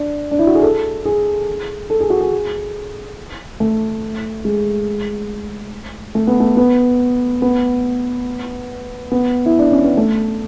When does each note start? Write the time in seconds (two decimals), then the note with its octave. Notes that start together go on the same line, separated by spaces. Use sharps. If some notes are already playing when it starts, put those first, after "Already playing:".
Already playing: D4
0.31 D4
0.39 E4
0.47 F#4
0.55 G#4
0.62 A4
1.05 G#4
1.90 A4
2.00 G#4
2.10 F#4
2.21 G#4
3.60 A3
4.45 G#3
6.15 A3
6.27 B3
6.40 A3
6.57 B3
7.42 B3
9.11 B3
9.46 E4
9.59 D4
9.71 C#4
9.84 B3
9.97 A3